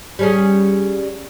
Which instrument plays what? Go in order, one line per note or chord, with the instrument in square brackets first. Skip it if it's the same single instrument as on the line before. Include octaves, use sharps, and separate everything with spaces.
[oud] G3 C#4 G#4